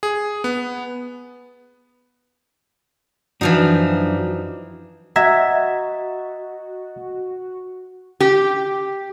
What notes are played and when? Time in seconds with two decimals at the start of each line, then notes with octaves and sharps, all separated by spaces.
0.03 G#4
0.44 B3
3.41 F#2 E3 F3 D4 D#4 F#4
5.16 F#4 D#5 E5 F#5 A#5 G#6
8.20 G4